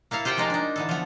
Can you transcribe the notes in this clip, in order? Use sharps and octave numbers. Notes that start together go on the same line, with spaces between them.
A#3 E4 A4 F5
F4 G4 C5 F#5 G5
F3 G#3 A#3 D#4 F4 D5
D4 D#4
D3 E3 A4
F3 B3